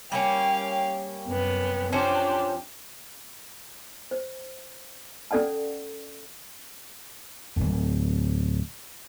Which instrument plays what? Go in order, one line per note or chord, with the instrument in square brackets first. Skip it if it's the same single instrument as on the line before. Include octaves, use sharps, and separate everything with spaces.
[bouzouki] G3 A#3 C#4 [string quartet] F5 G5
[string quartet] F#2 C3 B3
[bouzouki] F3 C#4 C5 [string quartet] D4 G4
[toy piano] C5
C#4 A4 D5 F#5 A5
[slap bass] D1 G#1